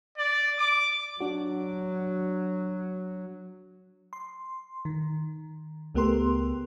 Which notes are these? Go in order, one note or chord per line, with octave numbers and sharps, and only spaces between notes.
D5
D6
F#3 D4 F#4
C6
D#3
C#2 A3 B3 G4 A#4 C6